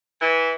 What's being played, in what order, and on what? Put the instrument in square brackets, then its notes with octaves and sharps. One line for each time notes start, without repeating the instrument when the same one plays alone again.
[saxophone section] E3